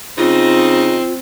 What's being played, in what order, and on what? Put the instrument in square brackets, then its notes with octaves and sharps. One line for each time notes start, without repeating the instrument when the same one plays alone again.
[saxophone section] C#3 D#4 [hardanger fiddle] C4 [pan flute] F4